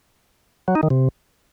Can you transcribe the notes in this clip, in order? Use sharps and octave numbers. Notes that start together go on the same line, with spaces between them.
F#3
D#4
D#3
C3